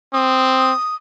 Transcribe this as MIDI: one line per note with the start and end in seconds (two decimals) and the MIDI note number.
0.13 0.72 60
0.13 0.95 87